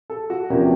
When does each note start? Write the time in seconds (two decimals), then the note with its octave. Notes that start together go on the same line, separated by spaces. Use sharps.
0.10 A4
0.30 F#4
0.50 E2 C3 F3 A#3 C#4 G4